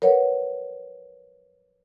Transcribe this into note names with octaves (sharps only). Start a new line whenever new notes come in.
A#4 B4 C#5 F#5